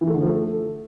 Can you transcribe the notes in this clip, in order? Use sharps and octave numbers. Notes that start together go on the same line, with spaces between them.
E3
A3
D3
F3
A3